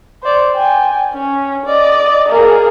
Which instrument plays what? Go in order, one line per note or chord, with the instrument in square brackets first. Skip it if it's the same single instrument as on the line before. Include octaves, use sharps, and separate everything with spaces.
[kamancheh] C5 D5
G5 G#5
C#4
D5 D#5
A#3 G#4